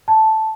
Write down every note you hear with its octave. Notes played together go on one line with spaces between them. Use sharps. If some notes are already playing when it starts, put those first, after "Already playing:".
A5